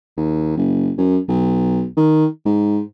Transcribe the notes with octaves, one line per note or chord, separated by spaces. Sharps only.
D#2
F#1
F#2
B1
D#3
G#2